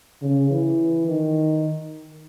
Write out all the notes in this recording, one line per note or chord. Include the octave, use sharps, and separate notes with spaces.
C#3
E3
D#3